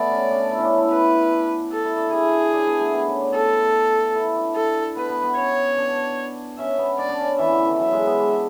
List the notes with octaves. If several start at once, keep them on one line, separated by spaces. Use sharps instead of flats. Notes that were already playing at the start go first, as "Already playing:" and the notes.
Already playing: A3 B3 D5
C#4
D4
E4
C#4
D4
E4
B4
A4
E4
D4
E4 G#4
D4
B3
A3
B3
C#4
D4
A4
E4
D4
A4
B3 B4
B3
B3
C#4 C#5
D4
C#4 E5
B3
D4 D5
D4
C#4
E3 E5
D3
E3
F#3 E5
G#3
B3
D4